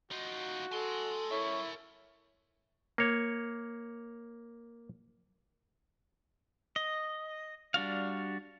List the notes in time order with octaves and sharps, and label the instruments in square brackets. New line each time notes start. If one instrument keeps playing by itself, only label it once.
[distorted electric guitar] D#4 F4 [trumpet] F#4
[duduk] A4 [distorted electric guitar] G#5 C6
[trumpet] E4 [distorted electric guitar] A#4 E5 [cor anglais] C#5
[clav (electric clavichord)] A#3 C#5
[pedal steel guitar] D#5
G3 D4 F#4 F5